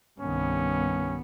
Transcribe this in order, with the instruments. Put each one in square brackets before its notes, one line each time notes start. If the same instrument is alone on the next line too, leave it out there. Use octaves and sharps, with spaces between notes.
[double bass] C2 D#3 [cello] G2 B3 [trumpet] C#4